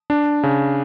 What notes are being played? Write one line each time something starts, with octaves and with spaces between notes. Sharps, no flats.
D4
C#3